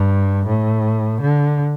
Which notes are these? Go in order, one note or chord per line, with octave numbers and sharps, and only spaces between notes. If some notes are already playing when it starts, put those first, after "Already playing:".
Already playing: G2
A2
D3